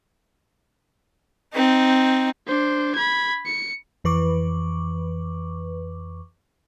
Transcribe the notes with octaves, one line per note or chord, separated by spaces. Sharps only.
C4 D#4
D4 C5
B5 G#6
C#7
F2 E3 B4 C#6 D6